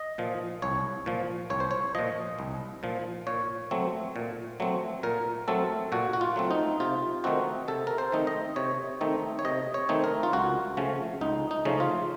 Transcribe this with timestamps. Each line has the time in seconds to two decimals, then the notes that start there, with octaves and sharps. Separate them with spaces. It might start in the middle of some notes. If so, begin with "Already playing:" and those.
Already playing: D#5
0.18 A#2 F3
0.62 C2 C#5
1.06 A#2 F3
1.50 C2 C#5
1.60 C5
1.71 C#5
1.95 A#2 F3 D#5
2.39 C2
2.83 A#2 F3
3.27 A#2 C#5
3.71 F#3 A3 C4
4.16 A#2
4.60 F#3 A3 C4
5.03 A#2 A#4
5.48 F#3 A3 C4 A4
5.92 A#2 F#4
6.13 F#4
6.21 F4
6.36 F#3 A3 C4
6.51 D#4
6.80 C3 F4
7.24 D#3 A3 C4 D#4 F#4
7.68 C3 A4
7.87 A#4
7.98 C5
8.12 D#3 A3 C4 D#4
8.27 D#5
8.56 C3 C#5
9.01 D#3 A3 C4 D#4
9.39 C#5
9.45 C3 D#5
9.74 C#5
9.89 D#3 A3 C4 D#4
10.04 A#4
10.23 F4
10.33 C#2 F#4
10.77 C#3 F3 A3 C#4
11.21 C#2 D#4
11.51 D#4
11.65 C#3 F3 A3 C#4
11.80 F4